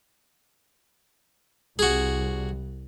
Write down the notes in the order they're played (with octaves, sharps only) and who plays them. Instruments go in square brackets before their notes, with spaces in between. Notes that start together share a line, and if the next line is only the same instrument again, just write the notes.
[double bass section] C2 [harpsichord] F#4 G#4